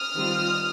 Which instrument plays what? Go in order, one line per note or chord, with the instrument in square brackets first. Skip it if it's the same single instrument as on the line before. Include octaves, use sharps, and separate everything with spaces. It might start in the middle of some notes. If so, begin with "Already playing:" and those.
Already playing: [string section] D#6 F6
D#3 G3 C4 F4